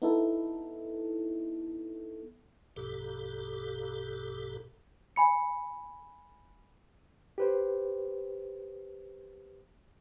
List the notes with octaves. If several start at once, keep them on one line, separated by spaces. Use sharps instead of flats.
B3 D#4 E4 A4
A#1 G2 B2 G4 A4
G#5 B5 C#7
G4 B4 C5